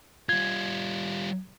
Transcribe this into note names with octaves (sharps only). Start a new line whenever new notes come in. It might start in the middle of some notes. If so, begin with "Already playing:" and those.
G3 F4 G#6